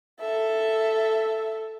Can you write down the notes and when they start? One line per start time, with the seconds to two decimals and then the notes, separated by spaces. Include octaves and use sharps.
0.21 A4 E5